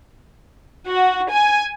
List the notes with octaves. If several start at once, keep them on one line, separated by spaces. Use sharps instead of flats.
F#4
G#5